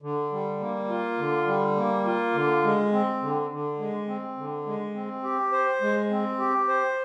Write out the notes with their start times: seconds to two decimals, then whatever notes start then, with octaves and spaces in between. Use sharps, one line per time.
0.02 D3
0.32 G3
0.61 A#3
0.89 F4
1.18 D3
1.47 G3
1.77 A#3
2.05 F4
2.34 D3
2.64 G#3
2.92 C4
3.22 D3
3.50 D3
3.79 G#3
4.08 C4
4.37 D3
4.66 G#3
4.94 C4
5.23 G4
5.52 C5
5.81 G#3
6.10 C4
6.39 G4
6.68 C5